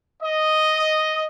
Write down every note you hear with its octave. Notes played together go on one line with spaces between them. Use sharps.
D#5